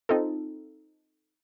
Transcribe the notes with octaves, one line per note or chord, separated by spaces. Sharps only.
C4 D#4 F4 A4